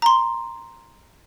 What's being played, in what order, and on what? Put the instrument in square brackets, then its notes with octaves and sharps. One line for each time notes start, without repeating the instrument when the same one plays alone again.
[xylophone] A#5 C6